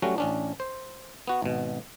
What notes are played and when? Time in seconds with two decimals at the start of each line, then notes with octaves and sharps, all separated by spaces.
0.02 F#3 G3 A3 C#4 F#4
0.18 A1 C#4 D4
0.60 C5
1.28 B3 F#4
1.42 G#1 B2